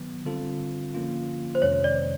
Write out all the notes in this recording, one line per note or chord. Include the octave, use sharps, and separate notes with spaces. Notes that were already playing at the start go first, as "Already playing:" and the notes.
Already playing: D#3 F#3 B3
D3 G3 C4 F4 A4
D3 F3 A#3 C#4 F4
C5
F2 C3 D#3 G#3 C#4 C#5
D5